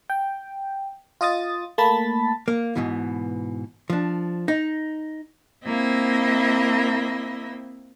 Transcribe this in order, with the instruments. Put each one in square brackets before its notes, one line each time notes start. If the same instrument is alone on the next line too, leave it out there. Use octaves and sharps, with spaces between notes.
[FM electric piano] G5
F4 D#5 D#6 A6
A3 A#3 A5 B5 A6 B6
[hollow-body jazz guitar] A#3
G#2 B2 E3
F3 D4
D#4
[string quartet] A#3 C4 E4 D#5 E5